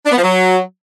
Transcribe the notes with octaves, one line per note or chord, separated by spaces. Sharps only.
D4
B3
F3
F#3